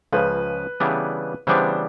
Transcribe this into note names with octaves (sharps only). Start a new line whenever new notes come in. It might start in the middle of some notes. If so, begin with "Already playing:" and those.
C#2 C#3 F3 B4
C#3 E3 G3 B3 D4
C#3 E3 G3 B3 D4 C5